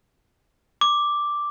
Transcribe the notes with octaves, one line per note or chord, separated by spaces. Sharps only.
D6